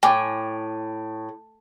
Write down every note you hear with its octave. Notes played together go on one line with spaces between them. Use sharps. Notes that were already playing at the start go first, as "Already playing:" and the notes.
A2 G5 G#5 D6